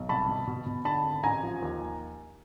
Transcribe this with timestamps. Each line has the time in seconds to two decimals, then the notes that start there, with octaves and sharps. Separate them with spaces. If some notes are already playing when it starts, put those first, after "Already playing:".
Already playing: B1
0.09 C2 A5 B5
0.29 B2
0.47 B2
0.66 B2
0.85 D3 A5 B5
1.04 G#1
1.23 A1 G#5 A#5
1.42 F3
1.62 D#2